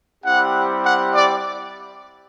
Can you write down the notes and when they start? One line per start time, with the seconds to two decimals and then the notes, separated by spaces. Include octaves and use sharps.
0.24 G3 C4 E4 G4 F#5
0.84 F#5
1.14 D5